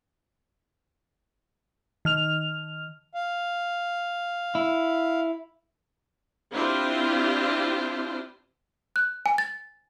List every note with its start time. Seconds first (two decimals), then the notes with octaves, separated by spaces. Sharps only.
2.05 D#3 F6 F7
3.15 F5
4.55 E4
6.52 C4 D4 E4 F4 G4 C5
8.96 F#6
9.26 G#5
9.38 A6